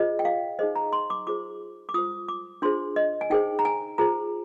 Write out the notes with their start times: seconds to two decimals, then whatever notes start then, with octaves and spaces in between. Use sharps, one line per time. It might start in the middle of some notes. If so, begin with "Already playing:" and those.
Already playing: F4 G#4 C5 D#5
0.19 G5
0.25 F5
0.59 D#4 G#4 C5 D#5
0.76 A#5
0.93 C6
1.10 D6
1.27 F4 G#4 C5 D6
1.89 D6
1.94 F4 C5 D#6
2.28 D6
2.62 D4 F4 G#4 C5 C6
2.96 D#5
3.21 G#5
3.30 D#4 G#4 C5 G5
3.59 A#5
3.65 G#5
3.98 F4 G#4 C5 A#5